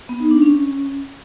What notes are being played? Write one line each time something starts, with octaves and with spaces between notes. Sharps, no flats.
B3
D#4
D4
C#4